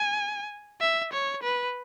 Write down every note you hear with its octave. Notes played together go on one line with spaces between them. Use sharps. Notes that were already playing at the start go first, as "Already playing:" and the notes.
Already playing: G#5
E5
C#5
B4